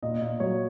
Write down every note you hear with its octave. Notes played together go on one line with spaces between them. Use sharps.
A#2 D#5
A#2
F#3 C#5